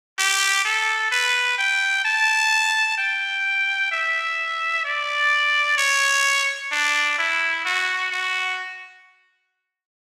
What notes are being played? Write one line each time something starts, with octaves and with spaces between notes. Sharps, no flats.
G4
A4
B4
G5
A5
G5
E5
D5
C#5
D4
E4
F#4
F#4